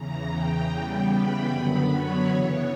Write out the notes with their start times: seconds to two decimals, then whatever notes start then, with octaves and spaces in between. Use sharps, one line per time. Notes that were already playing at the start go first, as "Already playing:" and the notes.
Already playing: E2 C#3 E3 A#5
0.31 G5
0.70 C#3 E3 G3 B3 G5
1.11 B5
1.49 F#2 D3 F#3 B3
1.90 C#5
2.28 C#3 E3 B3 C#5